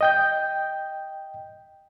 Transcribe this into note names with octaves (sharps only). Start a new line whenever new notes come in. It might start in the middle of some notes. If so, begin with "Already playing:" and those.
D#5 G5 G6